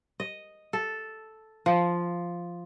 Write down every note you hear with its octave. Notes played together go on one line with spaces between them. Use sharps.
D#5
A4
F3